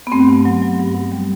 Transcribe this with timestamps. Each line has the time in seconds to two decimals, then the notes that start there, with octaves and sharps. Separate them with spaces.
0.07 B3
0.12 G2 A3 C4
0.28 G2
0.45 F#3
0.62 F#3
0.79 G2
0.95 G2
1.12 G3